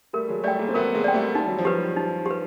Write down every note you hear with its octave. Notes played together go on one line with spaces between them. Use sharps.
G3 A3 A#4
F#3 G#3
G3 A3 D5 G5
G#3 A#3
C4
A3 B3 A#4
G#3 A#3
D5 G5
G3 A3
G3 D#4
F#3
F3 G3
G4 B4
D#4
G4 B4